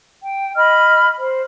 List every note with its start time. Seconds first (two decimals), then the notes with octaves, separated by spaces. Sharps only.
0.23 G5
0.56 D#5 B5 F6
1.19 C5